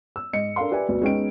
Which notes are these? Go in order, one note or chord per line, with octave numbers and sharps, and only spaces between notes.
E6
G#2 D#5 C#7
D4 A4 A#4 F5 C6
G4 B4 D5 E5 G#5
D2 B2 B3 D5
G#3 B3 C#4 D#4 G5 D7